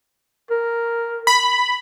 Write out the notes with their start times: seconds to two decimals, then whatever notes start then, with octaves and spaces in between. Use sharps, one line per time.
0.51 A#4
1.27 B5